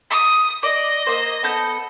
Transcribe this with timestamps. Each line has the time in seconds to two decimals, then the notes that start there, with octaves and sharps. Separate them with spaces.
0.10 D#6
0.63 D5 D#5
1.07 A#3 C5
1.43 B3 A4 G6